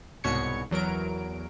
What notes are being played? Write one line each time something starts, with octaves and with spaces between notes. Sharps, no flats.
C2 G#2 B2 C#5 G#6 C#7
E2 F#3 A#4 D7